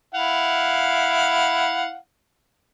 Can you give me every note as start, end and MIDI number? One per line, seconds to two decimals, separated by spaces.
0.14 1.96 64
0.14 1.96 77
0.14 1.96 78